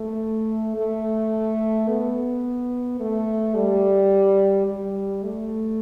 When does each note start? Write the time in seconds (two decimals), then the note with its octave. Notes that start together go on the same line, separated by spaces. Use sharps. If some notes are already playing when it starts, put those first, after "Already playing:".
Already playing: A3
0.76 A3
1.88 B3
3.00 A3
3.56 G3
4.67 G3
5.24 A3